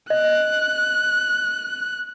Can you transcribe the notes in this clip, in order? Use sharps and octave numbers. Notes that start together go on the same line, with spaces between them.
D#5 F#6